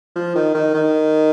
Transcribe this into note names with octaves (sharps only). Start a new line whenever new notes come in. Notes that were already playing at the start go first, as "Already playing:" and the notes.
F3
D#3
D#3
D#3